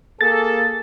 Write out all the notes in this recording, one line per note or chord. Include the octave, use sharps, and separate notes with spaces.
A#3 G#4 A4 A6